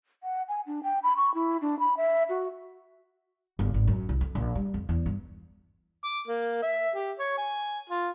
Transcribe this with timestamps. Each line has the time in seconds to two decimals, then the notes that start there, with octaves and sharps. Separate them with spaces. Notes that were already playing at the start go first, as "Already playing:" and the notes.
0.23 F#5
0.48 G#5
0.67 D4
0.84 G5
1.03 B5
1.17 C#6
1.34 E4
1.62 D4
1.79 B5
1.97 E5
2.29 F#4
3.59 G1
3.74 G#1
3.88 F#2
4.09 C2
4.21 F2
4.35 A#1
4.55 G3
4.74 F2
4.89 E2
5.06 G2
6.05 D6
6.27 A#3
6.63 E5
6.95 G4
7.19 C#5
7.38 G#5
7.90 F4